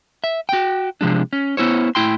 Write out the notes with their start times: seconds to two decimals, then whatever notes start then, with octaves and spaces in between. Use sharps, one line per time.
0.24 E5
0.49 F#4 G5
1.01 C3 F3 G#3 D4
1.33 C#4
1.57 B3 E4 C5 C#5
1.95 A2 E4 G5 C6